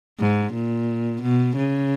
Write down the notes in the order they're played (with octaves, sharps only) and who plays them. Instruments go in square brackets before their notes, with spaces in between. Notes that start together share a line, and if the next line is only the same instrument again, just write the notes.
[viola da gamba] G#2
A#2
B2
C#3